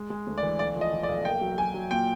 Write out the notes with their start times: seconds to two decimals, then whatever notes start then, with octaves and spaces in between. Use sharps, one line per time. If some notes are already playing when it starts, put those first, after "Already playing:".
Already playing: G#3
0.10 G#3
0.27 D2
0.38 D5
0.42 E3
0.59 B1 D5
0.76 F3
0.81 D#5
0.92 F3
1.03 D5
1.09 B1
1.25 A#3 G5
1.41 F#3
1.58 F#3 G#5
1.74 F#3
1.91 A#2 G5